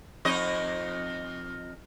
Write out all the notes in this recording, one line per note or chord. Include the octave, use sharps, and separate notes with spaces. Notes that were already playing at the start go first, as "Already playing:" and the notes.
F2 D#4 D#5